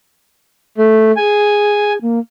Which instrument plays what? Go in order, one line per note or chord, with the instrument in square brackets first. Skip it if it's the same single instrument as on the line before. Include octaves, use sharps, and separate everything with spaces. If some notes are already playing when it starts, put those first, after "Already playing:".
[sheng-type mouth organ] A3
[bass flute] G#4 [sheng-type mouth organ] G#5
[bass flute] A#3